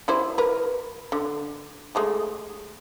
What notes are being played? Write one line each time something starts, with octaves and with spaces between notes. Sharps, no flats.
G3 E4 C5
A#4 B4
D3
G#3 A3 G4